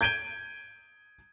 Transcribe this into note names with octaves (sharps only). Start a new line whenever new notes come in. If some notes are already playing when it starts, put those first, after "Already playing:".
G6 G#6 D7 D#7 G7